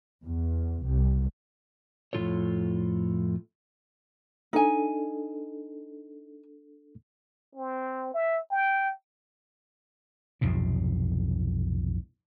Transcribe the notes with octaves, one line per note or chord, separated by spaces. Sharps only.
E2
C2
F2 A2 C#3 F4 A4 C#5
D4 D#4 A4 G#5
C4
E5
G5
B1 F2 G#2 C3